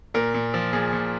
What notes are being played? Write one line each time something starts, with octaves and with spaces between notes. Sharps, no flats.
A#2 A#4
A#2
F3
A#2 G#4
A#2